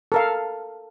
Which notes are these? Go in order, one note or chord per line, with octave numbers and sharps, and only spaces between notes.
A4 A#4 F5